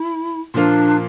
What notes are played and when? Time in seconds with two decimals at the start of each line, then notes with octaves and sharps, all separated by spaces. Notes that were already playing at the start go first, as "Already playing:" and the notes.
Already playing: E4
0.54 A#2 F3 A#3 D4 F4